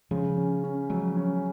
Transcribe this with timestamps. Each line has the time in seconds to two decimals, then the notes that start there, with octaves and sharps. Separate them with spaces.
0.11 C#3 F3 G#3
0.38 C#4
0.64 C#4
0.90 F3 F#3 G#3
1.17 C#4